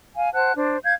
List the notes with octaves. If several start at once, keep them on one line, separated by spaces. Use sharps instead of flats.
F5 G#5
C5 F#5 A5 F#6
D4 C5
F5 G6 G#6